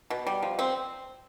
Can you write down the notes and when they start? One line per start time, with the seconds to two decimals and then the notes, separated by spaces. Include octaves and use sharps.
0.10 B2
0.27 G3
0.43 F3
0.59 C4